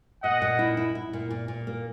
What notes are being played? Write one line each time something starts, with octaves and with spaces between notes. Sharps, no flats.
A#2 D#5 F#5
A#2
E4
E4
E4
A#2
A#2
A#2
A#3